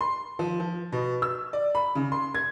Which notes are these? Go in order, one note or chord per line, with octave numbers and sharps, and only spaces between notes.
C6
F3
F3
B2
E6
D5
B5
C#3
C6
G#6